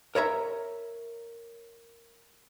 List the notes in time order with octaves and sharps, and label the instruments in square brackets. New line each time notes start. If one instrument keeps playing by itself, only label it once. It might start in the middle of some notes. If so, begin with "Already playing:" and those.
[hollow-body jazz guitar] A#4 C#5 E5 A#5